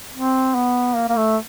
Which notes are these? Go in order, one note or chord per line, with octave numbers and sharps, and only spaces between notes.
C4
B3
A#3
A#3
A3